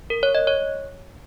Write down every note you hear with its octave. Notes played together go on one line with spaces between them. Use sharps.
A#4
C#5
D#5
C#5